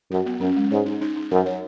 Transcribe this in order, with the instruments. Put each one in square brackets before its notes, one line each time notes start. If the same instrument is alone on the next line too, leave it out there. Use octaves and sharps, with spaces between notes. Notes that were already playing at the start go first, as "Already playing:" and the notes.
[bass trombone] F#2 [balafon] F#4
[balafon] B3
[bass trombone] F#2 [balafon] C#4
[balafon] G#3
[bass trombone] G#2 [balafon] C#5
[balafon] D#4
D#4
D#4
[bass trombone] F#2 [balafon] A#4
[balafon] C#5